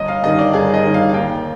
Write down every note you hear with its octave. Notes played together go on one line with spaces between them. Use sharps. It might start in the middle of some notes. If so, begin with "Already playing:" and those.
Already playing: G1 D#5
F5
G2 D#3 D#5
D5
G1 G#4
D#5
G2 D#3
F5
F5
D#2 G5